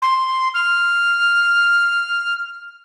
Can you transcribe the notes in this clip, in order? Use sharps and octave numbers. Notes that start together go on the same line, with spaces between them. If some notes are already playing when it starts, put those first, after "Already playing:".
C6
F6